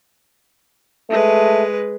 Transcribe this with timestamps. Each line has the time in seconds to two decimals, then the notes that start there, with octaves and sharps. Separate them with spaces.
1.10 G#3 A3 B4